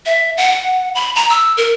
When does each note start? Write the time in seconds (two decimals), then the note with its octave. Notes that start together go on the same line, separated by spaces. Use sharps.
0.06 E5
0.37 F#5
0.95 B5
1.16 A#5
1.30 E6
1.57 A#4